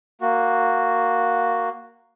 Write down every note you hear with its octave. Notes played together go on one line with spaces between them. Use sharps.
A#3 F#4